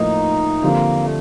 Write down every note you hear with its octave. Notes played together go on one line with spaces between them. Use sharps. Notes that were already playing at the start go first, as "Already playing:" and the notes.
Already playing: A2 F3 A#3 D#4
D3 F3 A#3 C4 G4
A3